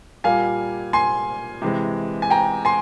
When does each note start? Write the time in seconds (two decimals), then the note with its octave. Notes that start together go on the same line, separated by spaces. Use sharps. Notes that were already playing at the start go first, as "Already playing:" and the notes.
0.24 A#2 G3 A#3 F5 G#5
0.93 G#5 C6
1.62 C3 E3 G#3
2.22 G#5
2.30 G5 A#5
2.65 G#5 C6